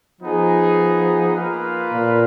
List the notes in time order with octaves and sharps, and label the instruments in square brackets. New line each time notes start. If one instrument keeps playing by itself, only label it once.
[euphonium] F3 [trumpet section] B3 D#4 G#4
[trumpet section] A#3 F4 B4 F5
[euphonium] A#2